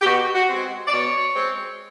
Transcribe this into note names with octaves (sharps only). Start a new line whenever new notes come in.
G4
B2 F#4
F#4
G#3 C4
D5
B2 C#5
G#3 C4